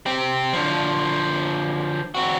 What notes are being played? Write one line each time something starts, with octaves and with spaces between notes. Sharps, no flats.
C4 G4
D3 F3
C4 F#4